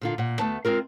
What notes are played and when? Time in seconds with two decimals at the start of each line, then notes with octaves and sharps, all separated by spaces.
0.01 A#2 D3 F4
0.18 A#2 F#5
0.39 D2 A3 B3 A5
0.65 G#3 C4 F4 A#4